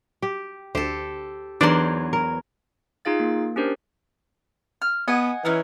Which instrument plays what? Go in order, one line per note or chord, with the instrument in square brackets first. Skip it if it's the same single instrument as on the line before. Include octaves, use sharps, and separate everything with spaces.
[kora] G4
[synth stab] D2 [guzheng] G4 A4 [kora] C5
[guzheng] E2 F#3 C6 [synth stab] D4 D#4 [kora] A#4 C5 D5
[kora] A#4
[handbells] D#4 F4 G#4 F5 A6
A#3
C#4 D4 G4 A#4 C5
[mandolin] F6
[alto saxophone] B3 [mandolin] D#5 F#5 G#5
[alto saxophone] E3 [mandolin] C#4 D#4 A#4